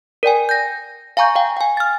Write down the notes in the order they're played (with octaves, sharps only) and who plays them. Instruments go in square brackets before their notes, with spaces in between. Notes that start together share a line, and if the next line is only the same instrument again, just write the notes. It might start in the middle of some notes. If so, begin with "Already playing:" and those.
[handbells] A#4 D5 G5 G#5
G6 A#6
F5 G#5 A#5 C#6 G6
F5 G5
G5 G#5
F6 A6